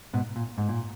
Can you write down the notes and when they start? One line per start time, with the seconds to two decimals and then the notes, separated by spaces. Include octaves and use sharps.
0.13 G#2 B2
0.36 A#2
0.58 G#2
0.69 A#2